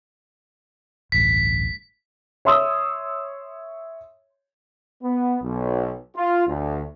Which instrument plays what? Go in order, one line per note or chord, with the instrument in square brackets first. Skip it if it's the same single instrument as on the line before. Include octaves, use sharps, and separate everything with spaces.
[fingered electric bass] D1 A1 G2 [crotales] B6
[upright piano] C#5 E5 C6 D#6 E6
[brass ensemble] B3
B1
F4
D2